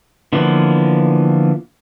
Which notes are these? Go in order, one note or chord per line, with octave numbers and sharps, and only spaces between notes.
D3 E3 F3 A#3 B3